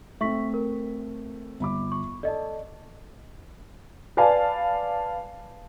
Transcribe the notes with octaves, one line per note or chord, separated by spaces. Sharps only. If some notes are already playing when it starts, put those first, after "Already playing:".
A3 C4 E5 C#6 B6
A#4
G1 B5 D6
C#6
A4 D5 D#5 A5
B4 D5 F5 G#5 A5